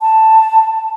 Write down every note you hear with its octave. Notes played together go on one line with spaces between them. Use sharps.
A5